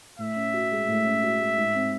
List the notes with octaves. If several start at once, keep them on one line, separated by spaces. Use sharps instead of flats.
A2 E5
C#4
F#4
G#3
A2
C#4
F#4
G#3
G#2
C4